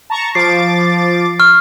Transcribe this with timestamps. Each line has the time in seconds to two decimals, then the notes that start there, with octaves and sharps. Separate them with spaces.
0.10 A5 A#5 C#6
0.35 F3 D6 A6 C7
1.40 C#6 F6